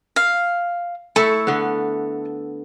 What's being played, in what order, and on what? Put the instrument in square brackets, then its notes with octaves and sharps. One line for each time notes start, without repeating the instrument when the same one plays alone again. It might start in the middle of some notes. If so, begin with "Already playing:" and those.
[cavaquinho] F5
[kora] A3 E4 [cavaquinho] A4 C#6
[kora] D3 B3